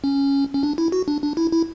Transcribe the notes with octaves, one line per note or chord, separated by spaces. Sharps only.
C#4
C#4
D4
E4
F#4
D4
D4
E4
E4